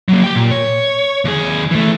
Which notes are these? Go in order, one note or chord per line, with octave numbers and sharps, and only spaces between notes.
F#3 A#3
G4 G5
A#2
C#5
D#2 G#4
E3 A3